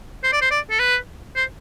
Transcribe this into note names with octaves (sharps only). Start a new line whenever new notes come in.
C5
D5
C5
D5
A4
B4
C5